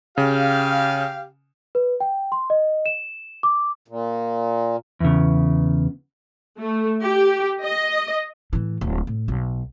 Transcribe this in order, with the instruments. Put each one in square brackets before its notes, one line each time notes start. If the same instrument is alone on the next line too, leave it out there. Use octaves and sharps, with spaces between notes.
[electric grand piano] C#3 [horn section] G4 F5
[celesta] B4
G5
C6
D#5
E7
D6
[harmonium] A#2
[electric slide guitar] E2 C#3
[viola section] A3
G4
D#5
[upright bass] A2 E3
D1
A2
B1